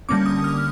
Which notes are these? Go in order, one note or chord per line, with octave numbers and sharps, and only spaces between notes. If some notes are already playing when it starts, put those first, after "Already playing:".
D3 G3 A#3 C#4 D6
D#6
F6